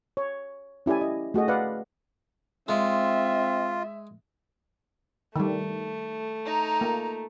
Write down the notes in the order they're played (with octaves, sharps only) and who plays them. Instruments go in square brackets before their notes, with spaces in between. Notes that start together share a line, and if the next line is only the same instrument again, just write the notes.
[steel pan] C#5
C#4 E4 G4 D5 G#5
D#5
A3 F#4 G#4 D#5
B4 D5 F5 F#5
[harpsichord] G#3 [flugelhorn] C4 [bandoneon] F4 [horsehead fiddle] E5
[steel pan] D#3 G3 [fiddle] A3
[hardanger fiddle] D#4 A#5
[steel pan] A#3